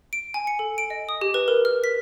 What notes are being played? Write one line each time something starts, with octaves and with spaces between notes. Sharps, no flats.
D7
G#5
C#7
A4
D7
D#5
D#6
G4
B4
A#4
F6
B6